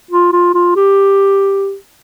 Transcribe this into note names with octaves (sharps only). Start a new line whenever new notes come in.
F4
F4
F4
G4